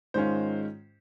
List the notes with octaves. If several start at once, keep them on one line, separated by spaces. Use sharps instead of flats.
G#2 D#3 G#3 C#4 F4 C5